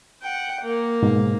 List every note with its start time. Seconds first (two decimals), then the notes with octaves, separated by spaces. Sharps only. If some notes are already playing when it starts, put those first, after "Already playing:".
0.22 F#5 G5
0.62 A#3
1.03 G#2 B2